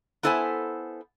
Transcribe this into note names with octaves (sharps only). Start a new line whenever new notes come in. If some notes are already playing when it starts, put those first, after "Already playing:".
B3 E4 A4 C5 D5 G#5